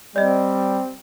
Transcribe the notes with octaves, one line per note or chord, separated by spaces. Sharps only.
G3 C4 D5 D#5